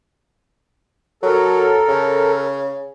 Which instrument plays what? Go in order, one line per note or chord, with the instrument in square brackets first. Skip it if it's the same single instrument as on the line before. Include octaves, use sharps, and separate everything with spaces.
[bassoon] F#3 [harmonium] A4 A#4
[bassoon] C#3